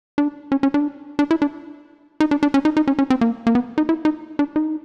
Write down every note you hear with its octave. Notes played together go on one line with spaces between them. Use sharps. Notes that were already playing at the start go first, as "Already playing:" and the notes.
D4
C#4
C#4
D4
D4
E4
D4
D#4
D4
D4
C#4
D#4
D#4
C#4
C#4
C4
A#3
A#3
B3
D#4
E4
D#4
D4
D#4